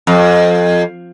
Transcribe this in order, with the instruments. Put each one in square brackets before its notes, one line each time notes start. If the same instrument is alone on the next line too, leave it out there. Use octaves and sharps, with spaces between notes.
[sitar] F2